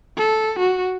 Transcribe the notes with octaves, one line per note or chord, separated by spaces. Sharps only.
A4
F#4